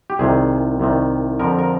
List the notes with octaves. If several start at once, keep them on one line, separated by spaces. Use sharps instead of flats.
G4
C2 C3 D#3 G#4
C2 C3 D#3
F2 D3 F3 A#4
A#4